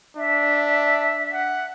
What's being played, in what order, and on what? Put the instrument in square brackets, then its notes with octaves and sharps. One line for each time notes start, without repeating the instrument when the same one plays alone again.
[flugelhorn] D4 [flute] E5
[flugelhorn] F#5